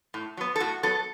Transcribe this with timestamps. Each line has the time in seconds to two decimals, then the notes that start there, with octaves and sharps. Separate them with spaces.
0.14 A2
0.37 F#3 B3
0.56 A4
0.60 A2 F#4
0.83 F#3 B3 A4